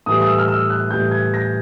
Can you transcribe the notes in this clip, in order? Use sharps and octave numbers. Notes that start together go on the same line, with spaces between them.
A2 E3 G3 D#6
D#6
E6
F6
E6
F#6
A2 E3 G3 G6
G#6
A#6